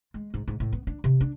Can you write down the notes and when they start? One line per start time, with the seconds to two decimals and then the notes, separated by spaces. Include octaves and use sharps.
0.14 G#3
0.34 G#2
0.48 G#2
0.60 A2
0.73 B3
0.87 D4
1.04 C3
1.21 D4